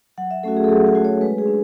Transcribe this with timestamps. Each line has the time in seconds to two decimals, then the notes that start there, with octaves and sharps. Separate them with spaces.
0.18 F#3 F#5
0.31 E5
0.43 A3 C#4 F#4 A4
0.57 G#4
0.64 A4
0.69 F#3 G#4
0.87 G#4
0.95 A3 C#4 F#4
1.05 C#5
1.21 G#3 B4
1.38 G#4
1.47 D4